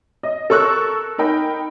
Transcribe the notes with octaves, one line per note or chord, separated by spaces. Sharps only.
D#5
A4 A#4 C#6 E6 F#6
D#4 A#4 G5 B5